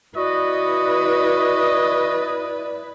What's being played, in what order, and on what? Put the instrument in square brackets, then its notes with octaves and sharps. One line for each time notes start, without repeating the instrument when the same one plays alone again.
[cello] E4 B4 [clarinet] F#4 [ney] D5 [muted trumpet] D#5